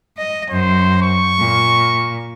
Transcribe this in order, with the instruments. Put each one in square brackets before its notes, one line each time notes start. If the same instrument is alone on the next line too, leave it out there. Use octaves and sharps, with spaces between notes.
[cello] D#5
[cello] F#2 [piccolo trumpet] C5
[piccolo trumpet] C#6
[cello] A#2